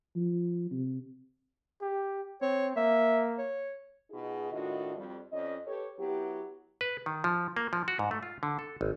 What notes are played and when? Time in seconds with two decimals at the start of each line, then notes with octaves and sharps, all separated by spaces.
0.16 F3
0.71 C3
1.81 G4
2.42 C4 C#5
2.76 A#3 E5
3.38 C#5
4.10 B2 D#4 F4 G#4
4.51 A2 D#3 D4 F4 F#4 D#5
4.96 F2 G3
5.32 F2 C#4 D5 D#5
5.65 G4 A4 B4 C#5
5.98 F#3 B3 E4 G4
6.81 B4
7.06 D#3
7.24 F3
7.57 A#3
7.73 F3
7.88 F#4
7.99 G#2
8.11 A3
8.23 F4
8.43 D3
8.59 A4
8.81 G#1